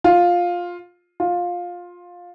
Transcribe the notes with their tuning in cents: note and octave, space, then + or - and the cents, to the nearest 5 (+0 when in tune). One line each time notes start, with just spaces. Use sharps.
F4 +10
F4 +15